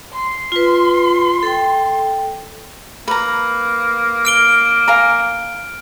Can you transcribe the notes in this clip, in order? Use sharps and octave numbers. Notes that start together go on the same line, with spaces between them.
C6
F4 B4
A4 G5
A#3 B4 A#5
F6 D7 G7
F5 G#5 A#5